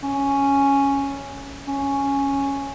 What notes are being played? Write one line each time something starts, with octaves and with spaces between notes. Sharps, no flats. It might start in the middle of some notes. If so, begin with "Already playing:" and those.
C#4
C#4